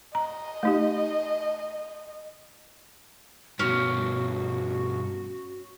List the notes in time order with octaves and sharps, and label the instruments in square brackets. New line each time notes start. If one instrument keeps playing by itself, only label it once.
[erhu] D#5 [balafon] A#5
[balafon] A3 D#4 G4
[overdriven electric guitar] G2 B2 [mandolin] C#4 [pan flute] F#4